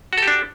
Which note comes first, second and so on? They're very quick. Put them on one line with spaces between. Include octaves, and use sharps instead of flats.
F#4 A4 G4 D4